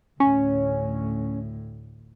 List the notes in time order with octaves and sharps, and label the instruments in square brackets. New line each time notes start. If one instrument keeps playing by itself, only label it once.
[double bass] D2 A2 [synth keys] C#4